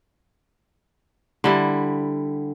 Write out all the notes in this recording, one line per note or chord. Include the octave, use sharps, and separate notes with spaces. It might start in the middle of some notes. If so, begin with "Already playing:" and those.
D3 G3 E4